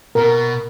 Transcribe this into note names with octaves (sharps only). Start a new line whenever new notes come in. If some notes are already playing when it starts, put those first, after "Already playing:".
B2 A#4